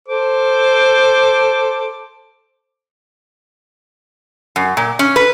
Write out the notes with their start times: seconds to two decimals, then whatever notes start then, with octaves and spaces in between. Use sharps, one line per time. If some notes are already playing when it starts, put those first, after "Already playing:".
0.08 A4 C5 D6
4.56 F#2
4.77 A#2
4.99 C#4
5.16 B4